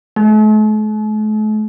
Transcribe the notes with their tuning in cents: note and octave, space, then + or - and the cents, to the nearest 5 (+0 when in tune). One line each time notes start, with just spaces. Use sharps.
A3 -45